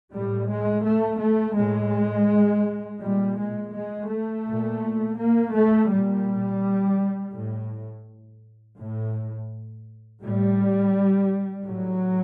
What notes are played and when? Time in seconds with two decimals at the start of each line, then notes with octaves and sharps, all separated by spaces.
0.13 A2 G3
0.49 G#3
0.85 A3
1.21 A3
1.57 A2 G#3
3.01 A#2 G3
3.37 G#3
3.73 G#3
4.09 A3
4.46 A#2
5.18 A#3
5.54 A3
5.90 A#2 G3
7.34 A2
8.78 A2
10.22 A2 G3
11.66 A2 F#3